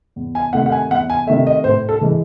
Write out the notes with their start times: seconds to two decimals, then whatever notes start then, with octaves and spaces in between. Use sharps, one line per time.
0.16 E2
0.35 G#5
0.53 C3 D#3 A3 F#5
0.66 F#5
0.72 G#5
0.90 E2 F#5
1.10 G#5
1.27 C3 D#3 A3 E5
1.47 D#5
1.64 A2 C5
1.89 A4
2.01 E3 G#3